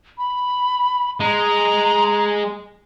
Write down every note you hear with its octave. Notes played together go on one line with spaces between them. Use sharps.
B5
G#3 A#5